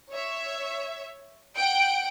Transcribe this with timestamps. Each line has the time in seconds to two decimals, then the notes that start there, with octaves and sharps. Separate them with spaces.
0.10 C#5 E5
1.56 F#5 G5 D7